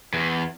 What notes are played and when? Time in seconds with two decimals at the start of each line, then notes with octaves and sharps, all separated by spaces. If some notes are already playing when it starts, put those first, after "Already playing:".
0.14 E2